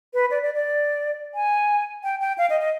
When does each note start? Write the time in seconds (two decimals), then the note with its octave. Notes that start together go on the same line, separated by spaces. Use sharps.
0.14 B4
0.31 D5
0.43 D5
0.54 D5
1.34 G#5
2.04 G5
2.21 G5
2.38 F5
2.50 D#5
2.61 D#5